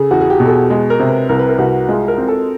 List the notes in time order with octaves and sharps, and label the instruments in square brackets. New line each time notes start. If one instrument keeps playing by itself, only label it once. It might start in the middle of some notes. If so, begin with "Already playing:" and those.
Already playing: [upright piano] C#3 [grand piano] G#4 A4
[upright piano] E2 [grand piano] F#4
[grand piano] G#4
G4
[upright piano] B2
[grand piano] A4
G#4
[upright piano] G#3
[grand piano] A#4
[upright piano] C3
[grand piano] B4
[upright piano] C2 [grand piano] A#4
[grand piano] B4
A#4
[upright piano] C2 [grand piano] F#4
[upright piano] G#3 [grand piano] F4
[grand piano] A#4
[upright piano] C4
[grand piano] A4